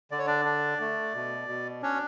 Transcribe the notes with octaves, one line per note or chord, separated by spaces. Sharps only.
D3 D5
C#5
D4 D5
D4
A3
B2
B2
C#4 D4 C#5